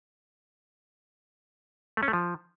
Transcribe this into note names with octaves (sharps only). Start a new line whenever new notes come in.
A3
C#4
A3
F3